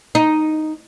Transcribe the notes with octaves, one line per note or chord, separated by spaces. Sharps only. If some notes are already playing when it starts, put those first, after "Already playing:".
D#4